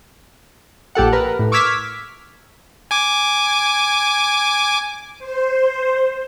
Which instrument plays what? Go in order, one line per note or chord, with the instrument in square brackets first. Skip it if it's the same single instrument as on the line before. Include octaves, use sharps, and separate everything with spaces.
[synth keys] A#1 G4 A4 F#5
A#4 B4
A2
C#6 D6 E6 F6 G#6 B6
[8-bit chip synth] G#5 D6
[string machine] C5